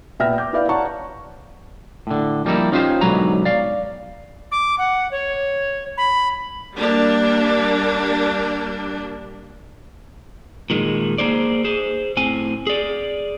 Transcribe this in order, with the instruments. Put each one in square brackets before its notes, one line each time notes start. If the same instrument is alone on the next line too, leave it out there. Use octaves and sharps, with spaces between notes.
[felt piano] A#2 B3 E5 G5 F6 A#6
D6 G6
E4 B4 D5 E5 F5
C#5 D5 F#5 A5 A#5 C#6
[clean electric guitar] A2 D3
F3 G3 A#3 D#4 E4
C#4 D#4 F4 G4 A#4 C5
B1 G#2 D3 F#3 B4 A#5
D5 F5
[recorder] D6
F#5
C#5
B5
[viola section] G3 A#3 D4
[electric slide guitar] A#2 D#3 G#3
A#3 G#4 C5 D5
G#4 C5
A2 C4 G#5
G#4 D5